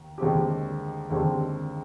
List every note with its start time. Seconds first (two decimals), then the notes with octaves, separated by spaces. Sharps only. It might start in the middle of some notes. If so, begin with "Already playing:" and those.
Already playing: D#2
0.18 D#2 D3 G#3 C4 G4
1.10 D#2 D3 G#3 C4 G4